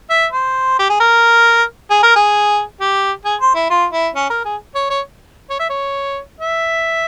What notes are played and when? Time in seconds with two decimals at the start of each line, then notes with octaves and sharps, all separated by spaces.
0.10 E5
0.32 C5
0.79 G4
0.89 G#4
1.00 A#4
1.90 G#4
2.03 A#4
2.16 G#4
2.80 G4
3.25 G#4
3.40 C5
3.55 E4
3.70 F4
3.93 E4
4.15 C#4
4.30 A#4
4.45 G#4
4.75 C#5
4.90 C#5
5.50 C#5
5.60 E5
5.70 C#5
6.40 E5